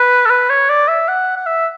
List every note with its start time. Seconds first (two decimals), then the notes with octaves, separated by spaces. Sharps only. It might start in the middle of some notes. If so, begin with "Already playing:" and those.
Already playing: B4
0.26 A4
0.30 B4
0.50 C#5
0.69 D5
0.88 E5
1.08 F#5
1.36 F#5
1.46 E5